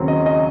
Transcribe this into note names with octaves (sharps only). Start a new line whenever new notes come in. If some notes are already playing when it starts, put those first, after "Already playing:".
Already playing: D#2 C#3 F#3 C4
D#5
D#5